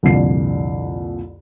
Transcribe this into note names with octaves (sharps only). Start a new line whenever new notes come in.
C2 F2 A#2 D3 C7